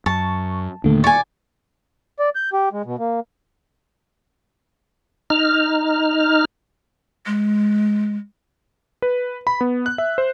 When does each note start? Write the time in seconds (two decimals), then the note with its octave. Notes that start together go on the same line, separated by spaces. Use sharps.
0.06 F#2 A5 C#6
0.84 D#2 A#2 D3 A3
1.04 D5 G#5 C#6
2.19 D5
2.36 G6
2.53 G4
2.72 G#3
2.85 B2
2.99 A#3
5.30 D#4 F6
7.26 G#3
9.02 B4
9.47 B5
9.61 B3
9.86 F#6
9.98 E5
10.18 C5